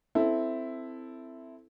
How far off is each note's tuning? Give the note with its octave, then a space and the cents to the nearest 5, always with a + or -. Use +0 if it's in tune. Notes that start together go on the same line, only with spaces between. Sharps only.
C4 -10 E4 +0 A4 +0